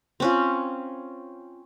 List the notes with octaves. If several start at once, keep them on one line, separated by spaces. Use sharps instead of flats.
C4 C#4 F4